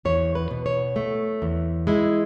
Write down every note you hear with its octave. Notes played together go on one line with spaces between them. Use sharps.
E2 C#5
B4
B2
C#5
A3
E2
G#3 E4